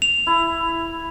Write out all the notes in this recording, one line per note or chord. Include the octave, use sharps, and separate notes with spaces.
F7
E4